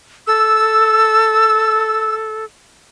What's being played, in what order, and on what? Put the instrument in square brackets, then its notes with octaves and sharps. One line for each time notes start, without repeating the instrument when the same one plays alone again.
[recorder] A4 [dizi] E6